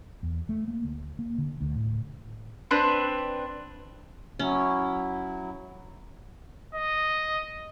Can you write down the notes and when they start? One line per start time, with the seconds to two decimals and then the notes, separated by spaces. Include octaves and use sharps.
0.23 E2
0.49 A3
0.68 A#3
0.83 D2
1.19 A#3
1.38 D3
1.61 D2
1.76 A2
2.71 C4 D4 B4
4.39 F#3 C#4 E4
6.75 D#5